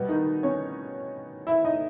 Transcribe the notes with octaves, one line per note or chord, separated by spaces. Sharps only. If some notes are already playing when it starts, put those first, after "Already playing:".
Already playing: B2 G3 B3
D#3 D#4
C#4 C#5
E4 E5
D#4 D#5